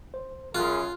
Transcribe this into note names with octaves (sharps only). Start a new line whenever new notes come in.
C5
F#2 F4 G#4 A#4 F6 F#6